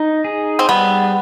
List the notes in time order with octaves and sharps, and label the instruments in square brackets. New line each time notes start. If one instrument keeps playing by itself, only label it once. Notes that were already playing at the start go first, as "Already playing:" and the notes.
Already playing: [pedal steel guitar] D#4
G#4
[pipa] C4
[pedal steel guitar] G3 [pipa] B3